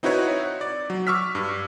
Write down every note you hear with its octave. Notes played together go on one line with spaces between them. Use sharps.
C4 D#4 E4 F#4 B4 C#5
D5
F#3
C#6 D6 E6 F6 B6
G2